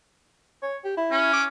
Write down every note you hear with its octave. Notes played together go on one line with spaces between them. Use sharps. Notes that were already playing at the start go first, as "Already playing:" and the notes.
C#5
G4
E4
C#4
D6